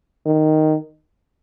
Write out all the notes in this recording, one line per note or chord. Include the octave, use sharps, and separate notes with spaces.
D#3